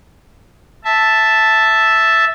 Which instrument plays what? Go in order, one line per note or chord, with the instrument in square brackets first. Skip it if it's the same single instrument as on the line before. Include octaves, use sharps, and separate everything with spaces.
[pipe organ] E5 A5